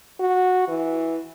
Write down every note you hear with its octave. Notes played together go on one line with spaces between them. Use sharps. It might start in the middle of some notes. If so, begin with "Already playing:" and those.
F#4
E3